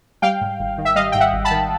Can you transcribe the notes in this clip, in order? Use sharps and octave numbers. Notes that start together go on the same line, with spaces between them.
G3 F5 G5
G#2
G#1
D#3
E5
G3 D#5 F5
G#2 G5
E5 F#5
G#1
A5 B5
D#3